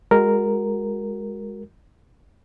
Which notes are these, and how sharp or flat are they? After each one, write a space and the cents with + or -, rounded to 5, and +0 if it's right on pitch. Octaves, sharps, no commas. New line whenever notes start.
G#3 -15 F#4 +0 A#4 +0